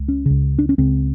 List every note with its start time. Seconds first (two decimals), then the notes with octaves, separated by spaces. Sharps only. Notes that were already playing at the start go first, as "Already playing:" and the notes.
Already playing: C#2
0.08 C#4
0.26 C#2 C#3
0.59 D4
0.69 C#4
0.78 C#2 C#3 C4